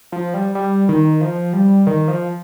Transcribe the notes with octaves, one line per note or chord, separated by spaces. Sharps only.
F3
G3
G3
D#3
F3
G3
D#3
F3